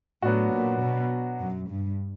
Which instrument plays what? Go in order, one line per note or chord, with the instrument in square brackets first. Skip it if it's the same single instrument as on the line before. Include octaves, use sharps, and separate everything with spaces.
[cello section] A2 [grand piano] F#3 B3 D4 F#4
[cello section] A#2
B2
F#2
G2